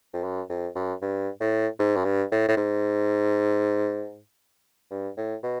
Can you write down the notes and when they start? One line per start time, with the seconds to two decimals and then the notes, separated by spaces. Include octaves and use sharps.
0.14 F2
0.24 F#2
0.50 F2
0.76 F#2
1.02 G2
1.40 A2
1.79 G#2
1.96 F#2
2.05 G2
2.31 A2
2.48 A2
2.57 G#2
4.91 G2
5.17 A2
5.43 B2